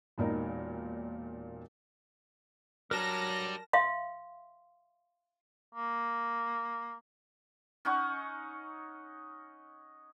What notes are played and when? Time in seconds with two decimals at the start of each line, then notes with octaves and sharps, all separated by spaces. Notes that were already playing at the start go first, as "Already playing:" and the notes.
0.18 E1 A#2 D#4 A#4
2.91 F#3 G3 D4 A#4 A5 A#5 A#6
3.73 E5 F5 C6
5.75 A#3
7.85 C#4 D#4 F#5 C#6